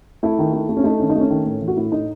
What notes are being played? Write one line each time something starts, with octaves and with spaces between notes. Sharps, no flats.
A3 E4
D#3
A3
A3
C#4
A3 D#4
D#3 C#4
D#4
A3 C#4
D#3
A2
E3
F#4
A2 E4
A2 D#4